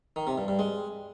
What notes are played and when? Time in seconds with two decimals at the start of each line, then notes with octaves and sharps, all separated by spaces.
0.16 D#3
0.27 C3
0.38 G2
0.48 G2
0.59 G#3